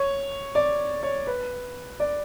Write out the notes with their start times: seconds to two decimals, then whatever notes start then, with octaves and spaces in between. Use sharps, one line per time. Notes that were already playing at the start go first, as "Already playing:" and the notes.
Already playing: C#5
0.55 D5
1.03 C#5
1.27 B4
2.00 D5